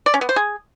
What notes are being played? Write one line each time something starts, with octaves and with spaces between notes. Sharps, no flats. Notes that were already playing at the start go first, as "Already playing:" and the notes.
D5
C#4
B3
C5
G#4